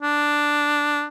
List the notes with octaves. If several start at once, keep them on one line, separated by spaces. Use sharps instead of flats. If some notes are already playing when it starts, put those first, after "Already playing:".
D4